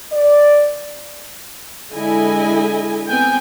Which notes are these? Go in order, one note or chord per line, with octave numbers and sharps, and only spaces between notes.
D5
D3 G#3 E4 D#5 G#5
B3 C4 G5 G#5